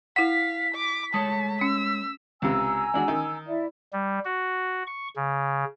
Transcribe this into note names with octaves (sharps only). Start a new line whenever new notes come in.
E4 F5 F#5 B6
D6
G#3 A3 C#5 A5 D#6
C#4 E6
C#2 C3 G#5 A#5 E6
G#3 D4 F#4
D#3
E4 D5 E5
G3
F#4
C#6
C#3